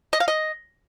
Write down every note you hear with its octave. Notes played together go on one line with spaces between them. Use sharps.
D#5
F5
D#5